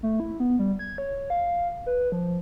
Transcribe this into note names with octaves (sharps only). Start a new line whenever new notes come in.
A3
E4
B3
G3
G#6
C#5
F5
B4
F3